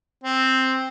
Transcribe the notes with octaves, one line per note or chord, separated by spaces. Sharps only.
C4